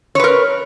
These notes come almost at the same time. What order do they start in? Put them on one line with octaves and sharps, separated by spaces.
C#5 B4 A#4